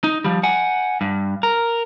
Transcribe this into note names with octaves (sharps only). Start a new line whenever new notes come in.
D#4
F3 G3
F#5 G#5
G2
A#4